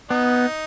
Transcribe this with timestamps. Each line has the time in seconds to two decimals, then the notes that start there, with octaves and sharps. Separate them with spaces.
0.10 B3 D#4